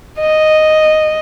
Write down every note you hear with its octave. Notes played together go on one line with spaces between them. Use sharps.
D#5